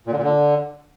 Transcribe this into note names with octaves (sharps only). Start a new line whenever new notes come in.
A#2
D3
A#2
D3